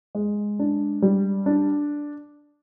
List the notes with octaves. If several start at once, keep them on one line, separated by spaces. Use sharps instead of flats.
G#3
D4
G3
D4